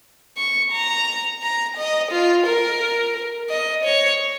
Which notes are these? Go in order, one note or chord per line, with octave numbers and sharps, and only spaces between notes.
C#6
A#5
A#5
D#5
F4
A#4
D#5
C#5